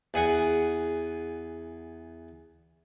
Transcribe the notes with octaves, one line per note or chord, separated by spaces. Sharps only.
E2 G#4 F#5 G#5